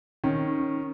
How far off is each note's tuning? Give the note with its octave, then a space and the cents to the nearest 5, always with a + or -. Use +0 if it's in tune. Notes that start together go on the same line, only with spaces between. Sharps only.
D#3 +0 C#4 -15